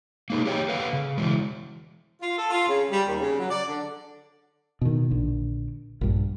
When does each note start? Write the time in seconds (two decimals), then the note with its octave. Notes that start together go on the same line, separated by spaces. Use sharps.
0.30 A#3 D#4 G#4
0.45 G4 G#4 C#5 F5 G5
0.69 A4 B4 F5
0.93 C#3
1.18 E3 G#3
2.22 F4
2.37 A4
2.50 F4
2.68 C#3
2.90 G3
3.07 D#2
3.20 C#3
3.38 F#3
3.50 D5
3.68 D3
4.81 B2 D#3
5.11 A#1 D3
6.01 A#1 G2